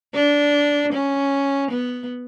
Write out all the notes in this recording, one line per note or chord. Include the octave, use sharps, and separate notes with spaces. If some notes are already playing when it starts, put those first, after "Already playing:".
D4
C#4
B3